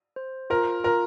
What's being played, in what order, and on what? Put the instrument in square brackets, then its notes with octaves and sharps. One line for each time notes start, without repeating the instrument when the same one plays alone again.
[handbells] C5
[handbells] F4 [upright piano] A#4
[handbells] F4 [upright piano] A#4